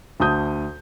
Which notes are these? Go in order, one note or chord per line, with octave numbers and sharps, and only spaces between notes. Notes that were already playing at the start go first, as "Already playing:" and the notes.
D2 A5 D#6 G6